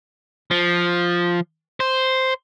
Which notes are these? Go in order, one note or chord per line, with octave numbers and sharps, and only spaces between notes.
F3
C5